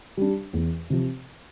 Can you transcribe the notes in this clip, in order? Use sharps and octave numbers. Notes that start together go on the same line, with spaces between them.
G3 D4
E2
C3 F3